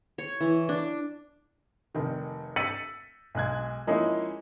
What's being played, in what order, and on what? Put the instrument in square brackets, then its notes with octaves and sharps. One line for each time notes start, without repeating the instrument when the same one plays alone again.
[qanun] C#5
E3
D4
[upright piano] F1 D#3
E6 A6 B6 C#7 D#7 F#7
B1 G#3 F#6 G#6
F3 G#3 A#3 C#4 D#4 E4